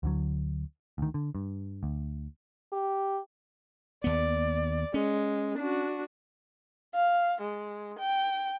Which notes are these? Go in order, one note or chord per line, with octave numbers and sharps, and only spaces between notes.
D2 D3 F#3
D2 D#3
D3
G2
D2
G4
D#2 B3 D5
G#3 C#4
D4 F#4
F5
G#3
G5